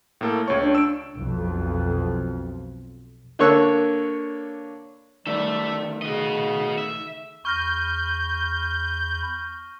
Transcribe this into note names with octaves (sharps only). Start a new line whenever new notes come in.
A2 A#3 A4
C#2 C#5 C#6
D4
E6 D7
B1 F2
D3 A#3 C#5 C#6 E6 F#6
D#3 G3 A3 A4 E5
C#3 F#4 D#5
E5
E2 B5 C#6 F6 G6 A#6